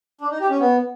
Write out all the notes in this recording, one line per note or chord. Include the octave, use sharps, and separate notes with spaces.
D4
D#4
G4
C#4
B3